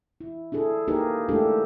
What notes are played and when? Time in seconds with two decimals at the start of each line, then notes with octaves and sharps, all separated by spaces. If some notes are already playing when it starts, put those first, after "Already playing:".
0.21 E4
0.52 D4 E4 G#4 A4
0.88 A#3 D#4 G4 G#4 A#4 B4
1.29 G#3 A3 D4 E4 G4 A4